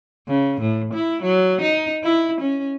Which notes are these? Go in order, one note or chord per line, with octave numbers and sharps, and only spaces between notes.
C#3
A2
E4
F#3
D#4
E4
C#4